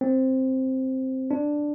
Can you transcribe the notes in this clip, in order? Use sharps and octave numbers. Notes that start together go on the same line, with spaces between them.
C4
D4